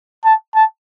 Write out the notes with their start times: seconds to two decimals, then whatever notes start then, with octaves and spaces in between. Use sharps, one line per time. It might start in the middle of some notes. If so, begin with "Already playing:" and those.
0.24 A5
0.55 A5